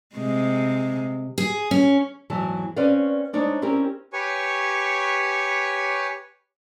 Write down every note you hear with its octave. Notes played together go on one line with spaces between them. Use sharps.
C3 G#3
G#4
C#4
E2 G#2 E3 F#3 A5
C4 C#4 B4 C#5 D5 F5
G#3 D4 D#4 C5 C#5
C4 C#4 E4 G4 A#4
G4 B4 C#5 G#5 C#6